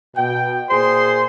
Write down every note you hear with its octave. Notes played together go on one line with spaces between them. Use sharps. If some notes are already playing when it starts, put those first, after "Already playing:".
B2 G5
A#2 G#4 C5 C6